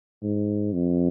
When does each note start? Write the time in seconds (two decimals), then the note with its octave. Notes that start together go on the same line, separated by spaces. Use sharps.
0.23 G#2
0.73 F2